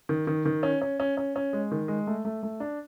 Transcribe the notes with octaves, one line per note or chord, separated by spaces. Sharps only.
D#3
D#3
D#3
C#4
C#4
C#4
C#4
C#4
G#3
D#3
G#3
A3
A3
A3
D4